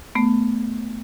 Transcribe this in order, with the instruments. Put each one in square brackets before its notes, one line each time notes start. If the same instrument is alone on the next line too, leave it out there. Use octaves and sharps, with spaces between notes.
[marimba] A3 B3